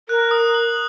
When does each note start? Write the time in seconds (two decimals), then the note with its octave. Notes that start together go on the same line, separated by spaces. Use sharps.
0.09 A#4 F#6
0.31 D#6
0.54 F#7